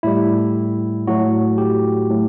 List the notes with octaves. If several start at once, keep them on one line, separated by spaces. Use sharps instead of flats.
A2 G3 E4
A2 F#3 F#4
G4
A2